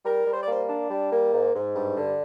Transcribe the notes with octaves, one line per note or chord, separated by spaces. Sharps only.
G3 A#4
G3
C5
D5
A#3 C5
D4
G3
A#3
G#2
G#2
G2
D3